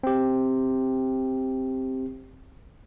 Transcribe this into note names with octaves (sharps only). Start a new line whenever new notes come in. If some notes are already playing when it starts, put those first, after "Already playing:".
C4 G4